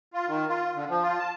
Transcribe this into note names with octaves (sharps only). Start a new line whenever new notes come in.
F4
D#3
F4
D3
F3
F4
A5